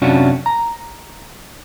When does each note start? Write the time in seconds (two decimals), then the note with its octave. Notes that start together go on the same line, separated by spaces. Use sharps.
0.02 F#2 C3 C#4 D4 F4 F#4
0.46 A#5